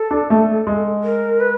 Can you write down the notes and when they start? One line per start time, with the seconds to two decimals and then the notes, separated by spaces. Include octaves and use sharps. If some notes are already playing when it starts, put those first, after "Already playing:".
Already playing: A4
0.11 D4
0.30 A3
0.67 G#3
1.04 A#4
1.40 B4